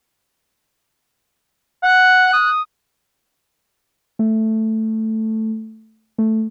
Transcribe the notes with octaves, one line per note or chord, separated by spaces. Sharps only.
F#5 F#6
D#6
A3
A3